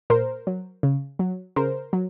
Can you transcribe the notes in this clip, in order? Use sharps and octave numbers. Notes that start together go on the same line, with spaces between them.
A#2 A#4 C5
F#3
C#3
F#3
C#3 A#4 C5
F#3